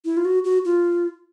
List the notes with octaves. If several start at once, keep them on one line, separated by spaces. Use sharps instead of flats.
E4
F4
F#4
F#4
F4